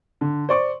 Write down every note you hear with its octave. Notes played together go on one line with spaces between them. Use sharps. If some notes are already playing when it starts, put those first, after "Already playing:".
D3
C5 D5 C#6